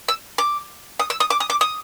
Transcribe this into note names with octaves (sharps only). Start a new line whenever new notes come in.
E6
D6
D#6
E6
D#6
D6
D#6
D6
D#6